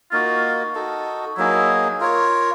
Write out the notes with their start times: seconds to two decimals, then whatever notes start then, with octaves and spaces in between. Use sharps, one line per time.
0.12 A#3 D#4 F4 F#4
0.75 D#4 F#4 A4
1.37 F#3 A#3 D#4 E4 G#4
2.00 F4 A#4 C#5